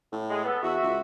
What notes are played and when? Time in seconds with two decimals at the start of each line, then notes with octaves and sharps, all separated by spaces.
0.12 A2
0.30 G#3
0.44 B3 A4
0.63 E2 F#4 E5
0.83 C#2